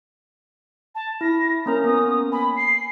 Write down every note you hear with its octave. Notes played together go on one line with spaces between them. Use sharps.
A5
E4 A#6
A#3 C#4 A#4 A#5
A#3 B3 D#6
G#5 B5
C7